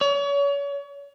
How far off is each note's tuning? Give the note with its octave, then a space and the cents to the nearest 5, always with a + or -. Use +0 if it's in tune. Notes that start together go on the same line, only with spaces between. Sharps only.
C#5 +35